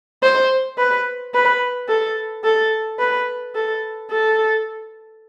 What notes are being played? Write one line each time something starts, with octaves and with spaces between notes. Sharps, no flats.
C5
B4
B4
A4
A4
B4
A4
A4